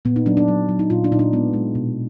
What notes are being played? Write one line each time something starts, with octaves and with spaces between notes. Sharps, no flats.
A#2 B3
D#4
F#3 D4
D4
F#3
F#3
D#4
A#2 F4
D4
A#2 D#4
D4
G#3 B3
G#3
B2